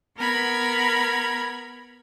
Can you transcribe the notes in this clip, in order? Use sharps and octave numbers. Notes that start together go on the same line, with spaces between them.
B3 A#4 B5 G#6